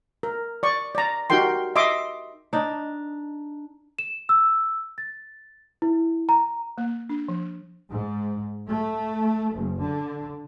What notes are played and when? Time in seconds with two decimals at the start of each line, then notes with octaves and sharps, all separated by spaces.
0.23 A#4
0.63 D5 C#6
0.95 D5 A#5
1.30 D#4 F#4 G4 A#4 G5 C6
1.76 D#5 E5 C6 D6
2.53 D4 D#4
3.99 E7
4.29 E6
4.98 A6
5.82 E4
6.29 A#5
6.78 A#3
7.09 D4
7.28 F3
7.91 G#2
8.66 A3
9.51 F#1
9.80 D3